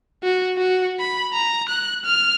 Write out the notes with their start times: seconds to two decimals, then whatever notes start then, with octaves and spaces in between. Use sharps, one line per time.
0.23 F#4
0.57 F#4
1.00 B5
1.34 A#5
1.69 F#6
2.05 F6